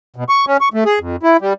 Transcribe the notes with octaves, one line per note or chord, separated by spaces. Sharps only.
B2
C#6
C#4
C#6
A3
G#4
F2
E4
G3